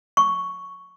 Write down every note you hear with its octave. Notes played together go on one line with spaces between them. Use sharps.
C#6